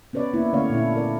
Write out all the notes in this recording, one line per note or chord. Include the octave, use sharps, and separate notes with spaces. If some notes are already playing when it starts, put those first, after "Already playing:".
B3 C#4 B4 C#5 D5
A#3 B3 E4
D3 A3 C#4 C#5 D5 F5
A#2 D4 E4
E4 A#4 D5